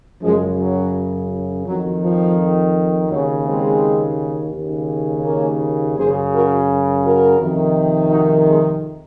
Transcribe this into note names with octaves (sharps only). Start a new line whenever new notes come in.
F#2 C#3 F3 G#3
F#3
F2 D#3 F#3
F3
D#2 C#3 F#3
G#3 C4
D#2 C#3
A#3 C#4
F#2 C#3 G#4 C5
F#4 A#4
F#4 A#4
F2 C3 D#3
D#4 F#4
G#3 C4